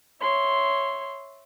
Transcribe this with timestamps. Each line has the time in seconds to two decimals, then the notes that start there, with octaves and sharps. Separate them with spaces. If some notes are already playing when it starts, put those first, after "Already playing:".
0.21 C#5 E5 C6